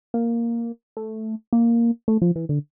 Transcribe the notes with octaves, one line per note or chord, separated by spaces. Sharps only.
A#3
A3
A#3
A3
F3
E3
D3